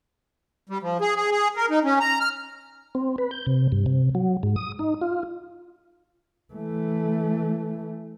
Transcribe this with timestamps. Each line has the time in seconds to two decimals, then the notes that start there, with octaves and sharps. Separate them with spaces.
0.69 G3
0.82 F3
1.01 G#4
1.16 G#4
1.31 G#4
1.57 A#4
1.70 D#4
1.84 C#4
2.00 A#5
2.20 F6
2.95 C4
3.18 B4
3.31 G6
3.47 C3
3.72 G2
3.86 C3
4.15 F#3
4.43 G#2
4.56 D#6
4.79 D#4
5.01 F4
6.54 E3 A3